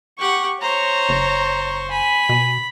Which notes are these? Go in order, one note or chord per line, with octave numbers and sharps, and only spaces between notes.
G4 F#5 C#6
C5 C#5 A#5 C#6
F#1
G#5 B5
B2